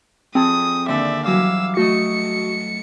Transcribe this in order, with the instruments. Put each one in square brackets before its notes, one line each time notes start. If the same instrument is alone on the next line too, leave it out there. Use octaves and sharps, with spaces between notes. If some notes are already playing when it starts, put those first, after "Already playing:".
[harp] F2 G#4 A5 [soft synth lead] C4 [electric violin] D#6
[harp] D#2 D3 [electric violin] D5 E5
[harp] E3 F#3 G3 [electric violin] F5 E6 [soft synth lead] D6
[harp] A3 A4 D#5 [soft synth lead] F#4 [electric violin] C#7